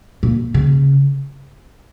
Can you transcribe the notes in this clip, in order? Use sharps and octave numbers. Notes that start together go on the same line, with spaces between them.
A#2
C#3